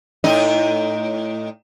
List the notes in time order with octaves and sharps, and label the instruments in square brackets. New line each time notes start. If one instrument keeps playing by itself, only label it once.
[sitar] A2 D#4 D#5